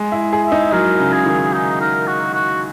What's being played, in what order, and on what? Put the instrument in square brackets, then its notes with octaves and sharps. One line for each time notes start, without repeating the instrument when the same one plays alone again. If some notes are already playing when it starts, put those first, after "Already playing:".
Already playing: [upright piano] G#3
E4
G#4
[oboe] E5
[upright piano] D#4
[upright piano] F#3 [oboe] A#4
[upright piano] C#3
[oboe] G#4
[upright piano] D#3
[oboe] D#4
A#4
F#4
F#4